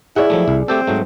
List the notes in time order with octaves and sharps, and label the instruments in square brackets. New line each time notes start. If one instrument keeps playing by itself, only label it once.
[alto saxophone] E4 [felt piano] G#4 D5 [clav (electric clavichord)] C#5 F#5
[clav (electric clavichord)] F3 F#3 A3
C2
[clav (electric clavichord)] A3 G4 A4 [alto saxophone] C4
[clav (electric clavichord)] G#2 F#3 A3